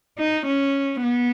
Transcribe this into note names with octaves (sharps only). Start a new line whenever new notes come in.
D#4
C#4
B3